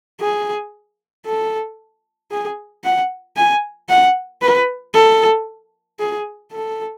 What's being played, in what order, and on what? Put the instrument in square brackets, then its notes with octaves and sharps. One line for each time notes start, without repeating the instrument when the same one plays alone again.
[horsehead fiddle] G#4
A4
G#4
F#5
G#5
F#5
B4
A4
G#4
A4